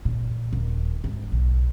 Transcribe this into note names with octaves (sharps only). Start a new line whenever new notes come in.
A#2
D#1
G#2
B1